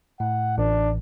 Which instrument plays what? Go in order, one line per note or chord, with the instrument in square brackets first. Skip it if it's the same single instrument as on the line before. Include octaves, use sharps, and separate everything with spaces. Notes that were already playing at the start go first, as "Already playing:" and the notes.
[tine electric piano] A2 [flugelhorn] F#5
[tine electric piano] A1 [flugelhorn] D4